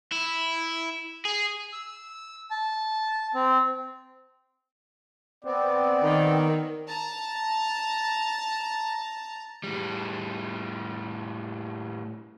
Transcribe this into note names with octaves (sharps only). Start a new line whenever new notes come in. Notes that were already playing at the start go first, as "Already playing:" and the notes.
E4
G#4
E6
A5
C4
B3 C4 D5
D#3
A5 A#5
A2 G3